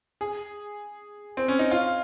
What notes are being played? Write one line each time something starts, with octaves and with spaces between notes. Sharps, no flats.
G#4
C4
C#4
D#4
F4